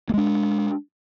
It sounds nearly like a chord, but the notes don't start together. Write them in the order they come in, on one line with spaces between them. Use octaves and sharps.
A#3 G#3 D4